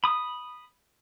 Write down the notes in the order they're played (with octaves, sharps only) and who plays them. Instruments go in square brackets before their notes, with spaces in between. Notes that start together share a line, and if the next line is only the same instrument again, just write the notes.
[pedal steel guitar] B5 D#6